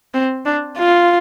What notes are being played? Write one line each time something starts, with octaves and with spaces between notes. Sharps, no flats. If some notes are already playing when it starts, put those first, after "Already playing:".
C4
D4
F4